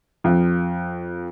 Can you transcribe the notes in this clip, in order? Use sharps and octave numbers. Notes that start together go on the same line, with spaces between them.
F2